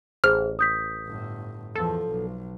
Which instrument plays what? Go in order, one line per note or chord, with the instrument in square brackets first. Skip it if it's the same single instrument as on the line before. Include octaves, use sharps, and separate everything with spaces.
[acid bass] A1 [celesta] G#4 C5 [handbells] F6
[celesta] D#6 G6 B6
[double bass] G1 A2
[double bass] E2 F3 [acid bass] A4
[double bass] B1